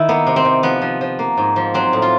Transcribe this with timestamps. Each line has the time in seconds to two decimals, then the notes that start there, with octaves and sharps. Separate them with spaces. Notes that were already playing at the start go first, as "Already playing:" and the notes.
Already playing: D#3 E4
0.09 A#3 B3
0.27 C3
0.36 C4
0.45 C3
0.63 F3 B3
0.82 F3
1.01 F3
1.19 A#3
1.37 G#2
1.56 F3
1.74 F#3 C4
1.93 A2
2.02 F4